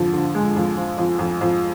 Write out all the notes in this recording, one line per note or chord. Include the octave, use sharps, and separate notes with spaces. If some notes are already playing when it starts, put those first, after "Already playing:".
Already playing: F2 D3 F3
D3
G#3
F2
F3
F2
F2
F2